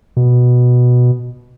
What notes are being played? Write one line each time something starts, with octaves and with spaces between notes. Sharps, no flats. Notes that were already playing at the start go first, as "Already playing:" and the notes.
B2